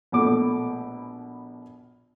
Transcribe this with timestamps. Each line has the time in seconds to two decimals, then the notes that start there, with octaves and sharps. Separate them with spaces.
0.12 A#1 B2 A3 D6